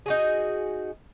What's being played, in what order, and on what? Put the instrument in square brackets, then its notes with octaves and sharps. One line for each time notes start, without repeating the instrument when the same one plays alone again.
[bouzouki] D#4 F#4 G#4